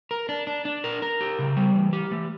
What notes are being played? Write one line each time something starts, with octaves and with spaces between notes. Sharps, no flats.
A#4
D4
D4
D4
A#4
A#4
G4
C#3
G3
E3
G4
A3